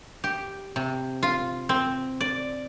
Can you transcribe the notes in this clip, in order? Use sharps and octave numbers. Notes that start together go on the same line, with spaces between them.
G4
C3
F4
C4
D5